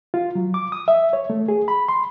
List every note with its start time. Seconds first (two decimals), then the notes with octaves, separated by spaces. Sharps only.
0.14 F4
0.35 F#3
0.54 D6
0.72 D#6
0.88 E5
1.13 C#5
1.30 A3
1.48 G#4
1.68 B5
1.88 C6